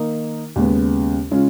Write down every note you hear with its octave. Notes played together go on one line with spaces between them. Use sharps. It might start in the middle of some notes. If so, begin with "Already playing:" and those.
Already playing: D#3 A#3 D#4
D#2 C#3 G#3 B3
C#3 G#3 C#4 F4